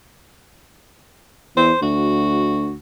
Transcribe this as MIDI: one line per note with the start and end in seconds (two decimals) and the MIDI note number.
1.56 1.72 40
1.56 1.77 72
1.82 2.76 38
1.82 2.76 66